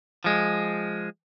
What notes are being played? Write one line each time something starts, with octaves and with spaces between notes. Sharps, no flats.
F3 G#3